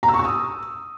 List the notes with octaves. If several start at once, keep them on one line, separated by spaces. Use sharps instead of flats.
A#5
E6
C#6
E6
D#6